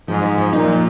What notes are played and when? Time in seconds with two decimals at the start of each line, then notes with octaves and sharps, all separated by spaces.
0.08 G#2 F3
0.23 F3
0.38 F3
0.53 A#2 D#4
0.67 F3